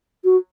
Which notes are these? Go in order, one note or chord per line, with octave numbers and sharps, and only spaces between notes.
F#4